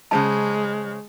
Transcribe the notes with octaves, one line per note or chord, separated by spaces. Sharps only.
C#3 G#3 C5 D#5 A5